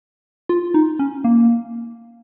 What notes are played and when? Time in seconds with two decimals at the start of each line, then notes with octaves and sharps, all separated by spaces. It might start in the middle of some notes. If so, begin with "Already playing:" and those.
0.49 F4
0.74 D#4
0.99 C#4
1.24 A#3